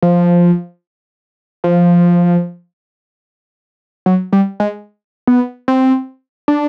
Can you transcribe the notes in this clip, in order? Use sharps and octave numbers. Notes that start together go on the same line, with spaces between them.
F3
F3
F#3
G3
G#3
B3
C4
D4